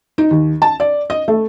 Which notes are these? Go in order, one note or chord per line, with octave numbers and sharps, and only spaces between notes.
D#4
D#2
A5
D5
D#5
A3